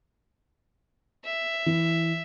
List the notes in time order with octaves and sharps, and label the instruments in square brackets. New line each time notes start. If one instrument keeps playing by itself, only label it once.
[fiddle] E5
[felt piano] E3